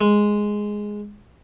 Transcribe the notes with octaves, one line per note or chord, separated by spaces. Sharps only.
G#3